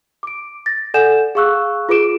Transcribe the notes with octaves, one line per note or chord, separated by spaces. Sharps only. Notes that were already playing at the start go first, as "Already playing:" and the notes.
D6 D7
A6 A#6
A4 D5 F#5 G#5 G6 E7
G#4 F5 C#6 E6 F#6
F4 G#4 B4 D6 D7 E7